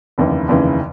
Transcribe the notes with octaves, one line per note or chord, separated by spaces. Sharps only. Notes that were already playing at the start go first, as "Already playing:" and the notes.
F1 D#2 C#3 E3
F1 D#2 C#3 E3